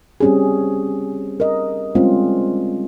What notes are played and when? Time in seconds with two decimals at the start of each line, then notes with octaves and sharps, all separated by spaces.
0.20 G3 C4 C#4 G4 G#4
1.40 A#4 D#5
1.95 G3 G#3 C4 C#4 F4